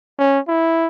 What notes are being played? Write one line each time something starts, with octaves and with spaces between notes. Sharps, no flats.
C#4
E4